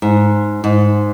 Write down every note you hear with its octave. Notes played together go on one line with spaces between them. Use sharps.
G#2
G#2